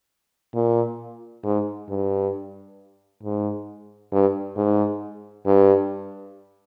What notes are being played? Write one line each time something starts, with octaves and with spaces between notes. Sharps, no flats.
A#2
G#2
G2
G#2
G2
G#2
G2